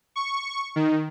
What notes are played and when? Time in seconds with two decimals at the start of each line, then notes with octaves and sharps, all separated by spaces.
0.16 C#6
0.76 D#3